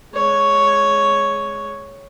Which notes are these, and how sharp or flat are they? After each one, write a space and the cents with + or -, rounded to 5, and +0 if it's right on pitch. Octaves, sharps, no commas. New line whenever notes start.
G#3 +15 C#5 +0